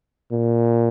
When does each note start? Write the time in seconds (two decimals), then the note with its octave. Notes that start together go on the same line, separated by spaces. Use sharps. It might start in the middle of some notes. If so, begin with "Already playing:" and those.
0.32 A#2